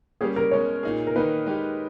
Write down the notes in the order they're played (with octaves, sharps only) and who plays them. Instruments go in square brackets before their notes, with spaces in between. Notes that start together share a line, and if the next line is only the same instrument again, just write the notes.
[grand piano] G3 A#3 C#4 G4 [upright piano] G#4
[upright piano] A#4
[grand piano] B2 G#3 C#4 [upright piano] C#5
[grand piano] A#2 A#3 D#4 G#4
[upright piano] A#4
[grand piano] D#3 A#3 D#4 [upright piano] B4
[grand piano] G#3 D#4 G4